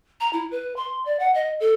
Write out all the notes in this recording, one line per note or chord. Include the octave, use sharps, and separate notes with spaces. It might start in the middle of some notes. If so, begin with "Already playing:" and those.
A#5
E4
B4
C6
D5
F#5
D#5
A4